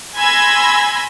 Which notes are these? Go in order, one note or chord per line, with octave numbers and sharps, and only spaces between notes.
G#5 B5 C6 E6 G#6 A#6